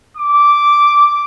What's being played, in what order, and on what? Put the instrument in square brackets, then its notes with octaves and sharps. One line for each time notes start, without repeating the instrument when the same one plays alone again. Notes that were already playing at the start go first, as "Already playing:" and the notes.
[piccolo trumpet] D6